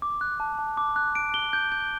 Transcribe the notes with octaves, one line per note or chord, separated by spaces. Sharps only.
D6
F#6
A5
A5
D6
F#6
D7
G7
G6
G6